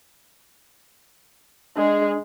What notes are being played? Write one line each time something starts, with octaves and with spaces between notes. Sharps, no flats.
G#3 D4 G#4 D#5